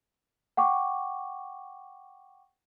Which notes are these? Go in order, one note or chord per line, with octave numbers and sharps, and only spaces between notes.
F#5 G5 C#6 D6